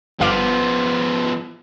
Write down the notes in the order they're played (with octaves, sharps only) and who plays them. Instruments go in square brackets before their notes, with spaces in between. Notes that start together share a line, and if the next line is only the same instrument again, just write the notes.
[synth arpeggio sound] G1 F5 D6 [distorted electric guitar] F3 B3